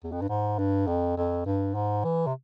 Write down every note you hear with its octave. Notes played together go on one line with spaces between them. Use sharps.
E2
F2
G2
G#2
G2
F2
F2
G2
G#2
E3
C3